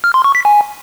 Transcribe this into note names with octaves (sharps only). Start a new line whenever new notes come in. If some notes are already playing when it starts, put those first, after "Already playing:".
F6
C6
C#6
B6
G#5